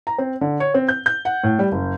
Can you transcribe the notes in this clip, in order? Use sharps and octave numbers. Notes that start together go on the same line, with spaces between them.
A#5
C4
D3
C#5
C4
G6
G6
F#5
A2
G3
F#1